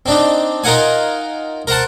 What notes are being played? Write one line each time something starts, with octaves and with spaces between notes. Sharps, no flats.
C4 D4 D#4
D#4 F4 A#4 F5 F#5 G#5
A#4 C5 F#5 A5